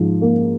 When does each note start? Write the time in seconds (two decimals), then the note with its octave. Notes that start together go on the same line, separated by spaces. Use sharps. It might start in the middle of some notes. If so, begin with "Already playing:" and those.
Already playing: G#2 F3
0.22 A#3